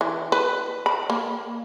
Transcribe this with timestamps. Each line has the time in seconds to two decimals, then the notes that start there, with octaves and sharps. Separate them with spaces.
0.01 E3
0.32 B4
0.86 B5
1.10 A#3